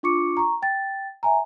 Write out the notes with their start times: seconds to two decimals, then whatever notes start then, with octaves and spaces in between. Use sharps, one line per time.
0.03 D4 F4 C#6 D6 C#7
0.37 A#5 C#6
0.62 G5 A6
1.23 E5 G#5 A#5